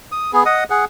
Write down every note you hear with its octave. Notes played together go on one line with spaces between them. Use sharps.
D#6
B3 G#4
D#5 F#5 D#6
G#4 F#5